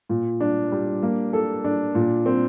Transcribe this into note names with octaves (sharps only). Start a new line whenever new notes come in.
A#2
D4
G3
A#3
A4
D4
A#2
C4